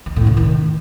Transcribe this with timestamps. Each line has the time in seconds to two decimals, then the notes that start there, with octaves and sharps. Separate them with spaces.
0.06 D#3
0.16 A2
0.27 C#3
0.37 D#3